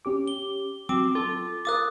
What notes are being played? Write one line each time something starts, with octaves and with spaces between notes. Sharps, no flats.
C#4 G4 D6
G7
F#3 C4 D6
F4 A4
A#4 F5 D6 D#6 F#6 A6